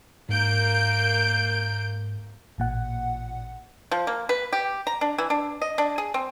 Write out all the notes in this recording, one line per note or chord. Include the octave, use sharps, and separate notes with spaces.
G#2 A#3 G6 D7
A1 A#2 F#5
F3
A#3
B4
G4
A#5
D4
E3
D4
D#5
D4
G#4
C4